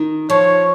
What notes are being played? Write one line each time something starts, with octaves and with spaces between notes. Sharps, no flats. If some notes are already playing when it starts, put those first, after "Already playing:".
Already playing: D#3
F3 C#5